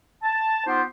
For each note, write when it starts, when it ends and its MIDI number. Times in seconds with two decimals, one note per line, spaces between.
0.23 0.66 81
0.66 0.82 59
0.66 0.82 63
0.66 0.82 65
0.66 0.82 67
0.66 0.82 72